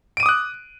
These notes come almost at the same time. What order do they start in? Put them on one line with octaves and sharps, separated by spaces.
D7 D#7 D6 D#6 F#6